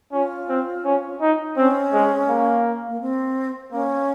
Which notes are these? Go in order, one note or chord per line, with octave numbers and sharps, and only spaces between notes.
C#4 F4
C4
C#4
D#4
C4 C#4
G#3
A#3
A#3
C4
A#3 C#4